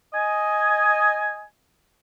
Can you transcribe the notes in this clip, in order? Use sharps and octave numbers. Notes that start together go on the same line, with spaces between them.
D#5 G#5